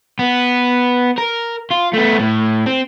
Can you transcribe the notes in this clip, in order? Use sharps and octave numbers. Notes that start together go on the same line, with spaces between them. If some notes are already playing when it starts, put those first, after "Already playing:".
B3
A#4
F4
A3 B3
A2
C4